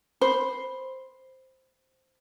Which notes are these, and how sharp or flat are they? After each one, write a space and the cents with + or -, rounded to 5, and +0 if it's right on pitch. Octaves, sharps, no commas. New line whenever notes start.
C5 +0 B5 +0